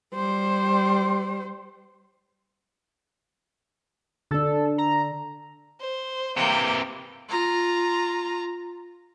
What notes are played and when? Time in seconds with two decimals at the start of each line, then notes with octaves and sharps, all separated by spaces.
0.14 G3 C5
4.31 D3 D4 A4
4.78 A#5
5.80 C5
6.37 C3 E3 A#3 G5
7.29 F4 A#5